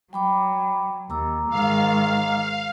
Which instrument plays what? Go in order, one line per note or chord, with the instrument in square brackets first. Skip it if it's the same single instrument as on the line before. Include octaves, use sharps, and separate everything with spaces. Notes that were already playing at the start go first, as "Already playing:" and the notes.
[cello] F#3 [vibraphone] G5 B5 D6
[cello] D#2 [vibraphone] A#5 D6 E6
[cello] G#2 D#3 [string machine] F5